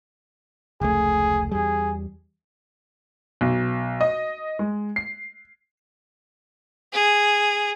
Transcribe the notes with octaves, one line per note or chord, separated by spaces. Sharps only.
F1 C#2 A3 G#4
E2 G3 G#4
B1
D#5
G#3
C7
G#4